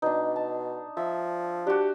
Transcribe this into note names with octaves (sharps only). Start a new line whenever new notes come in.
B2 D4 D#4
A5
F3 E5
D4 F#4 G4